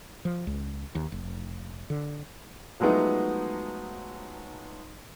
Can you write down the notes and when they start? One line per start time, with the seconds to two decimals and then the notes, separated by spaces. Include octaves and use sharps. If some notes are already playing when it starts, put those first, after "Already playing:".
0.25 F3
0.47 C#2
0.95 D#2
1.12 F1
1.90 D3
2.80 F3 F#3 G#3 A3 B3 D#4